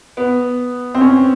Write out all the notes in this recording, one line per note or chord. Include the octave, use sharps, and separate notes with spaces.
B3
C4
C#4